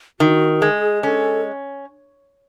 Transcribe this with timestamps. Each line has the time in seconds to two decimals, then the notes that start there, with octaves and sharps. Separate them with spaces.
0.20 D#3 F#4
0.61 G#3 G#4
1.03 C#4 A4